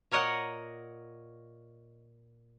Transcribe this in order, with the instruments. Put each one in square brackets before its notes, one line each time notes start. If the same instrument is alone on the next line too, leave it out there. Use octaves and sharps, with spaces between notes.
[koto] A#2 A#4 C#5 D#5 F#5